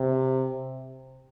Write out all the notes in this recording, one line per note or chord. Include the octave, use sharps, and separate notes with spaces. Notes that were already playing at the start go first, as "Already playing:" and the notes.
Already playing: C3